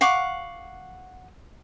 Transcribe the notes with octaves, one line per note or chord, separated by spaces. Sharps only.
F5 F#5 C#6 D6